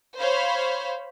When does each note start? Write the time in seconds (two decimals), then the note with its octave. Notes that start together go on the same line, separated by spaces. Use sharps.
0.19 C5 C#5 F5 B5